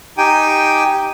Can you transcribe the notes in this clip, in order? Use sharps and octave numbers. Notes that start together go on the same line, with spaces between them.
D#4 G4 G5 G#5